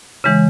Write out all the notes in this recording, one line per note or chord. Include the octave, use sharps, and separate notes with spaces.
C#3 E3 G#3